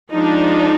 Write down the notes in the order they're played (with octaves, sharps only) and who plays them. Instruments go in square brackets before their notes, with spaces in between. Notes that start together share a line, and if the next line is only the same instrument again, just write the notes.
[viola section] F3 G#3 D4 D#4